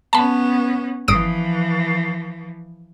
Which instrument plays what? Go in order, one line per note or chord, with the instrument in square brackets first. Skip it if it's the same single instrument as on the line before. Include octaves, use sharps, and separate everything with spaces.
[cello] B3 C#4 [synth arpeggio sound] A5 B5
[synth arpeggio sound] G1 D#6 D7 [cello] E3 F3